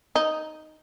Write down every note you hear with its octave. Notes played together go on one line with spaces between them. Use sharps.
D#4